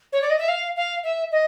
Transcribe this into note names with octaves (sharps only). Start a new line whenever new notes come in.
C#5
D5
D#5
E5
F5
F5
E5
D#5